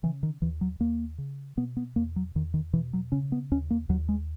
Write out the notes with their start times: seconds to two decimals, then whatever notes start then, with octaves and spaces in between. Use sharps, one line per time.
0.03 C#3 E3
0.23 D#3
0.42 D#2 E3
0.61 F#3
0.80 D#2 A#3
1.18 C#3
1.57 B2 B3
1.77 B3
1.96 E2 A#3
2.16 F#3
2.35 E2 D#3
2.54 D#3
2.73 B2 E3
2.93 F#3
3.12 C#3 C#4
3.32 B3
3.51 D#2 C#4
3.70 A#3
3.89 D#2 F#3
4.09 G#3